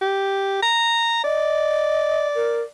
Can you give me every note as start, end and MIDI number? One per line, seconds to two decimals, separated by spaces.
0.01 0.61 67
0.62 1.23 82
1.24 2.71 74
1.24 2.28 75
2.35 2.61 70